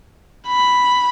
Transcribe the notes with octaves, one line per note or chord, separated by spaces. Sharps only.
B5